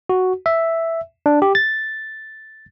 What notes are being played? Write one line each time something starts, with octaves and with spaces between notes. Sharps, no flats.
F#4
E5
D4
G4
A6